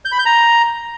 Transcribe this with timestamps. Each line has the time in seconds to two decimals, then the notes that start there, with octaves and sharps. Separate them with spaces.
0.05 G6
0.12 B5
0.19 G6
0.26 A#5